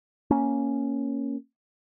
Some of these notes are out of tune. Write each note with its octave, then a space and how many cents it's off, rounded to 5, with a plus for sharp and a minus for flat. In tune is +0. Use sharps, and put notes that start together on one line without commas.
A#3 +0 C#4 +0